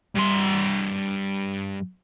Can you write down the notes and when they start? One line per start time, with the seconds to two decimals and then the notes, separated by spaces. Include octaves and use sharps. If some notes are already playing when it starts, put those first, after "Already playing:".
0.15 G2 C6